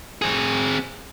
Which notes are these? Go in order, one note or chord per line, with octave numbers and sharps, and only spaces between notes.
C4 G#4